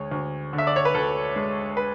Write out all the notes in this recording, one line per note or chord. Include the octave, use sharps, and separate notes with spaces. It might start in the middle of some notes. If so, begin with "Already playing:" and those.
Already playing: D2 G#3 C#5
D2
D3
E5
D5
C#5
B4
D2 A4
G#3
B4